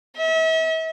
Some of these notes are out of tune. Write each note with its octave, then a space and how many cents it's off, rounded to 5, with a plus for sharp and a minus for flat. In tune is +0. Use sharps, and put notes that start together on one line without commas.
E5 -40